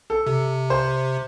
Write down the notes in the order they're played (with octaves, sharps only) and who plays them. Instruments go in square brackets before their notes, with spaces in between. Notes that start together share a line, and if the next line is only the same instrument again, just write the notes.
[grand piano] A4
[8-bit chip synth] C3
[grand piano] C5